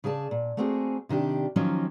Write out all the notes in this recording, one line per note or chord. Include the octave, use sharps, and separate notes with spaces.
C#3 G#4 D5 A5
A#2
A3 A#3 C4 F#4 G#4
C3 D#3 D4 G4
D#3 F3 F#3 A#3 C#4 D#4